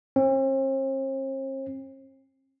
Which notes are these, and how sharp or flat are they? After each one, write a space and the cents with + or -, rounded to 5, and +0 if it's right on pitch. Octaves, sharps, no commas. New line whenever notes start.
C4 +45